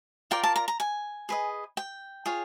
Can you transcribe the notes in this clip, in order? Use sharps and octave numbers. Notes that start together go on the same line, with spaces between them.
F4 A#4 D5 G5
A5
A#5
A#5
G#5
G#4 B4 D#5
G5
F4 G#4 C#5